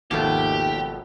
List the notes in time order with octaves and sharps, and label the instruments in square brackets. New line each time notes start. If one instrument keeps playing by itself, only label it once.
[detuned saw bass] G#1 [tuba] D#2 [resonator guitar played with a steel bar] B2 F3 A3 [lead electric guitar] G4